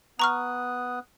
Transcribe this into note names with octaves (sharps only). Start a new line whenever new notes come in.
B3 A#5 C#6 D#6 F6 F#6